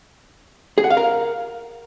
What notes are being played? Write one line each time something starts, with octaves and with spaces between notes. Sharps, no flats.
G#4
F#5
F5
A#4